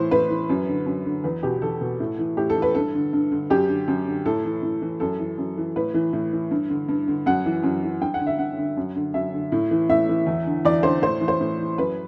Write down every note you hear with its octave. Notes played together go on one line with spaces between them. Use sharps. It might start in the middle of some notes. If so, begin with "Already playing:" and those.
Already playing: A2 E3 C5
A2 B4
E3
F#2
D3
F#2
D3
E2 B4
B2 G4
E2 A4
B2
A2
E3
A2 G4
A4
E3
B4
G2 A4
D3
G2
D3
F#2 G4
D3
F#2
D3
A2 A4
E3
A2
E3
F#2 A4
E3
F#2
E3
A2 B4
E3
A2
E3
G2
D3
G2
D3
F#2 F#5
E3
F#2
E3
G2 G5
F#5
D3
E5
G2 F#5
D3
F#2
D3
F#2 E5
D3
A2
E3
A2 E5
E3
E2
D3
E2 D5
D3 C5
A2 C5
E3
C5
A2
E3
F#2 B4